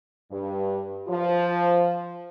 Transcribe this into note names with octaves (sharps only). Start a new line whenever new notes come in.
G2
F3